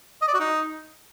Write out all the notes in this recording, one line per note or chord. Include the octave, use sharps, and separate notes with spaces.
D#5
D5
F#4
D#4